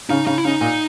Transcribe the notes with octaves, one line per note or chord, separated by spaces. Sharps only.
C#3 D#4
C#3 D#4
E4
C#3 D#4
A#2